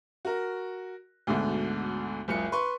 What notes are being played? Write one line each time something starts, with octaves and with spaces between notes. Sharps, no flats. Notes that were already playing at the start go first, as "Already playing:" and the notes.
F#4 A#4
D2 G#2 B2 D3
F#1 C#2 C#7
B4 C6 C#6